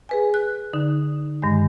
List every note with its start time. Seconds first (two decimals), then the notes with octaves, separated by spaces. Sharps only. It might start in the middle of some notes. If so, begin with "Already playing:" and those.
0.09 G#4 B4 G#5
0.34 F#6
0.73 D3 D#4
1.42 G2 D#3 G#3